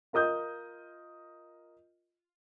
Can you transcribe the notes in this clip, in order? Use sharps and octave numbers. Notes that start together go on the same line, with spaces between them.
F4 A#4 D#5 D#6 G6